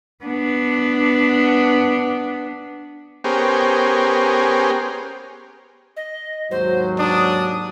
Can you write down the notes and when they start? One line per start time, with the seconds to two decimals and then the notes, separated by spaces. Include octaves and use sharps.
0.24 B3 D4
3.24 B3 C#4 G4 G#4 A#4 C5
5.97 D#5
6.51 D#2 G#2 F#3 C5
6.98 D4 D#6